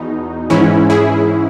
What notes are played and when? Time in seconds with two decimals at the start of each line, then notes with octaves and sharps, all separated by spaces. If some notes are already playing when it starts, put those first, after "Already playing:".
Already playing: E2 B2 D#4
0.50 G#2 E3 C#4 E4
0.90 E4 G#4